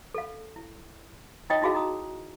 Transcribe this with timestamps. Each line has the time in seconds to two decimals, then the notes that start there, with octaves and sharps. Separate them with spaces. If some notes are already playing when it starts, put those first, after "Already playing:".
0.14 A4 F5
0.56 E4
1.50 D#4 F4 C#5 D#5 G5 D#6
1.62 D#4 E4 F#4 G#4 F5
1.74 D#4 A#5 D#6